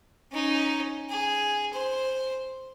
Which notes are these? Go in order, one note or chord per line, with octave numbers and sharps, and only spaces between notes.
C#4 D#4
G#4
C5